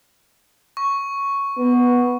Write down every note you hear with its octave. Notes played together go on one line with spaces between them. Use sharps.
C#6
B3